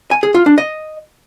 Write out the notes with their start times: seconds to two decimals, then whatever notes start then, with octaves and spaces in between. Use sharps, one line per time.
0.11 G#5
0.23 G#4
0.35 F4
0.46 D4
0.58 D#5